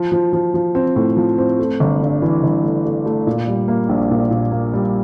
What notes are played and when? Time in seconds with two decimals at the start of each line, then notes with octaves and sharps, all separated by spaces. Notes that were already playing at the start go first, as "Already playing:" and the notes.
Already playing: F3
0.12 F3
0.33 F3
0.54 F3
0.75 C4
0.96 A2
1.17 F3
1.38 C4
1.59 A3
1.80 G1
2.01 G2
2.22 E3
2.43 G1
2.63 A3
2.85 A3
3.06 A3
3.27 A#2
3.48 G3
3.68 A#3
3.89 A#1
4.11 A#2
4.31 A#2
4.52 A#3
4.73 G3